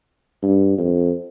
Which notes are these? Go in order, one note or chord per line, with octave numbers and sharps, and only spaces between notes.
G2
F2